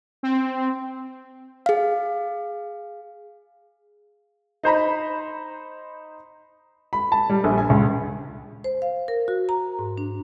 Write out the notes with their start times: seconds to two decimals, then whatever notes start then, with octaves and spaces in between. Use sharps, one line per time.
0.23 C4
1.66 G#4 F5
4.63 D#4 C5 A#5 B5
6.93 B5
7.12 A5
7.30 G3
7.44 A#1
7.58 G#5
7.70 C#2
8.64 C5
8.82 F5
9.08 A#4
9.28 F#4
9.49 A#5
9.79 G#2
9.98 D4